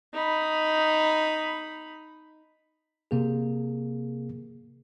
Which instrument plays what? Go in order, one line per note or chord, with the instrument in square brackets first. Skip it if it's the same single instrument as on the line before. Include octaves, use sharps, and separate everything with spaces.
[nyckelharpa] D#4 B5
[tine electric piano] C3 A#3 G#4